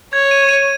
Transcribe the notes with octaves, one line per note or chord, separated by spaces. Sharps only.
C#5 G#6
D#7
D#7